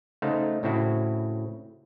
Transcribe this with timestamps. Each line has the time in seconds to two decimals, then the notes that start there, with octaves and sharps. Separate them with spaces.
0.22 C#3 A3 D#4 C5 F5 F#5
0.63 A2 C#3 C4 E4 F#4